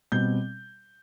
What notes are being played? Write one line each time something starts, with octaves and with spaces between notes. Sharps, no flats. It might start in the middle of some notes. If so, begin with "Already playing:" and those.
B2 G3 C4 G6